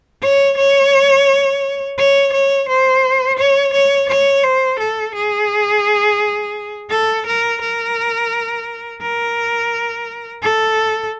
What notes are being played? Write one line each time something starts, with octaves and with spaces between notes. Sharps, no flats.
C#5
C#5
C#5
C#5
C5
C#5
C#5
C#5
C5
A4
G#4
A4
A#4
A#4
A#4
A4